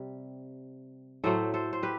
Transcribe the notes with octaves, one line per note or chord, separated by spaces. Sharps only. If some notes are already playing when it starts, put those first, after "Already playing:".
Already playing: C3 G3
A2 F#3 A3 A4 C5
A4 C5
C5
G4 B4